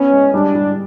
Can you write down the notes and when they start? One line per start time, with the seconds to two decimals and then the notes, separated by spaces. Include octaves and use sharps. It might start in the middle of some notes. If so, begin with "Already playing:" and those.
Already playing: B3 C#4
0.11 G#3
0.34 G3 D4
0.55 G3